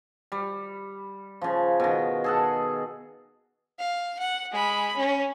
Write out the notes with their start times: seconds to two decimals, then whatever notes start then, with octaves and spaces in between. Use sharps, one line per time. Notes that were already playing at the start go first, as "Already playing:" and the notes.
0.32 G3
1.41 C#3 F3
1.80 B2 D#3
2.24 G#4 A4 F#5
3.79 F5
4.19 F#5
4.52 G#3 B5
4.96 C#4